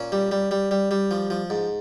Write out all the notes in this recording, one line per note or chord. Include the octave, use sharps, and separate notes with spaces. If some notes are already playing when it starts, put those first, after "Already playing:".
Already playing: A#2 C#4
G3
G3
G3
G3
G3
F3
F3
G#2